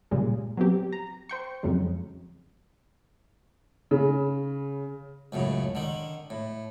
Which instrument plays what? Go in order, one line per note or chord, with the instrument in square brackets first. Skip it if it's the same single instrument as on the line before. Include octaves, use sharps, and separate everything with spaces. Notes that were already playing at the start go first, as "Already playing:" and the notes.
[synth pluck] A#2 C#3 G3 G#3
F#3 B3 C4 G4
A#5
C5 G5 C#6
F2 C#3 F#3 G#3
[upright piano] C#3
[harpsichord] C#2 F#2 A2 C#3
D3 D#3
A2